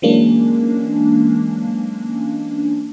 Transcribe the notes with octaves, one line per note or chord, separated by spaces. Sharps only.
E3 F#3 G#3 A#3 C#4 D4